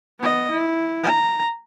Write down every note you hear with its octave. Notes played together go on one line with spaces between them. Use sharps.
B3 D#5
E4
A#5